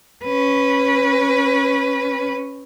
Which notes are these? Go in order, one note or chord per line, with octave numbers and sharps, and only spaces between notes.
C#4 B4